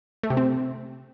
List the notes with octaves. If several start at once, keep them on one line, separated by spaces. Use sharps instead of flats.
A3
C3
C4